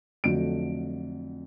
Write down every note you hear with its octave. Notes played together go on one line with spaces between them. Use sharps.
F2 D3 F#3 A3 D7